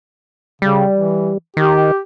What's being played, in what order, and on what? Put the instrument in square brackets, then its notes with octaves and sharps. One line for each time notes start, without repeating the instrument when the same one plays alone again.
[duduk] C#3 [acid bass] G3
[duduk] E3
[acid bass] D#3 [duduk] G4